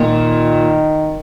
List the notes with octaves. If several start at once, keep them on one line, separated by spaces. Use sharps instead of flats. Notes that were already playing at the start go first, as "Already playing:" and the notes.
Already playing: A#2 D#3